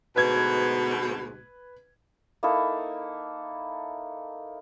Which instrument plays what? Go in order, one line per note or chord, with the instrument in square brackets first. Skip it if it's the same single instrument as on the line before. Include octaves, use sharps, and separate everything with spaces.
[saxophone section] D2 G#2 B2 [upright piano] B4 G#6
[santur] A#3 D#4 E4 A4